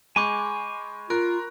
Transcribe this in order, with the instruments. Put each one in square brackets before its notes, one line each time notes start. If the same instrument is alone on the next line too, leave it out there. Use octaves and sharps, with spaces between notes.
[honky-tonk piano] G#3 [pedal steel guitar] G#5 D6 [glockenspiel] B5 C#6 G6
[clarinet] F4 [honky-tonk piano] A#4 [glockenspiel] F#6 D7